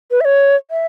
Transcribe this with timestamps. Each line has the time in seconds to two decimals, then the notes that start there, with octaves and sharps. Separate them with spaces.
0.11 B4
0.21 E5
0.25 C#5
0.71 E5